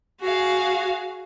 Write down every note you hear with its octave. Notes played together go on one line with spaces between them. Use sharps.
F#4 G#4 F5